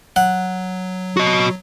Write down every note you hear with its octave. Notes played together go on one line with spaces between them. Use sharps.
F#3 F#5
F#4 D#5